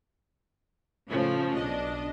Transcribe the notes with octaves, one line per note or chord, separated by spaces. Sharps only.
A2 C#3 F3 A3
B1 D4 D#5